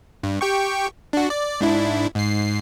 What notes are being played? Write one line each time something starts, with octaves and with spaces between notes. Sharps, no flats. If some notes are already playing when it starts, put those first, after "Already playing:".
G2
G4 G5 C#6
D4 F#4
D5
G#2 D4 E4
G#2 C7